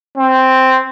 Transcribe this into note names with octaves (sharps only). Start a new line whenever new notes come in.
C4